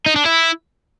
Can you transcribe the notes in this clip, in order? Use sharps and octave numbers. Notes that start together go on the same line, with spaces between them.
D#4
D4
E4